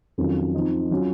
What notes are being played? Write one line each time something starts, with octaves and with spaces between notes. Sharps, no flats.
F2 D#3 F#3 C#4 F4
F3 C4 D#4
F#3 C#4 F4